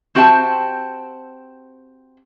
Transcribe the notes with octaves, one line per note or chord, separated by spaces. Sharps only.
C4 F#4 G4 C5 E5 A5